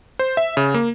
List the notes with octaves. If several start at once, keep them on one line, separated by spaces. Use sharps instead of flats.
C5
E5
C#3
A#3